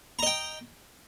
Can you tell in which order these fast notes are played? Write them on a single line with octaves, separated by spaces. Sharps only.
A#5 D#5 G5